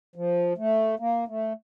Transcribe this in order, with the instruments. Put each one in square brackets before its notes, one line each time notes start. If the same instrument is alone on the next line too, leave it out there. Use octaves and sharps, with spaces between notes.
[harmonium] F3
A3
A#3
A3